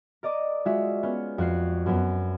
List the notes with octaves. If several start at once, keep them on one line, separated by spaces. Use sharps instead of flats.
A#4 D5 D#5 D6
G#3 F4 F#4 E5
B3 C#4 F6
F2 F#4 F#6 C7
F#2 B3